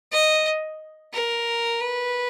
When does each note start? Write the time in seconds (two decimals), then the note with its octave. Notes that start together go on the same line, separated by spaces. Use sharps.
0.12 D#5
1.13 A#4
1.81 B4